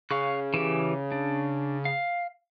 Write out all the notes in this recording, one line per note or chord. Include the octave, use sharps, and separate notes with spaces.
C#3 F5 C#6 F#6
E3 G4
D4
F5